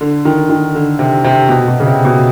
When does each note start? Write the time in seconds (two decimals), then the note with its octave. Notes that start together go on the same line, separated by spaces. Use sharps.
0.01 D3
0.25 D#3
0.50 D#3
0.75 D3
0.99 C3
1.24 C3
1.49 B2
1.68 B2
1.80 C#3
1.86 C3
2.05 B2